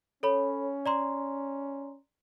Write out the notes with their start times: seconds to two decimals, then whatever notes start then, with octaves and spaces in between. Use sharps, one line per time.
0.23 C#4 A4 C#5 B5
0.86 D5 A#5 C6